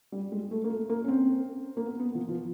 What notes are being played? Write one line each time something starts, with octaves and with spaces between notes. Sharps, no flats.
G3
G#3
A3
A#3
A3
A#3
C#4
C4
A#3
B3
B3
F3
F3